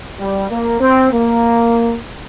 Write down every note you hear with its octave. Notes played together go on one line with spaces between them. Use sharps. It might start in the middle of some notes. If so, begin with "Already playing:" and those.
G3
A#3
C4
A#3